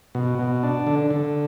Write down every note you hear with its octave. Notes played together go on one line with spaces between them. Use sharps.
B2
B2
D4
D3
D3